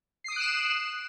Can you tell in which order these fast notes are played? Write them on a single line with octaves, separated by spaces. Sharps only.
C7 D#6 D7 F#6 E7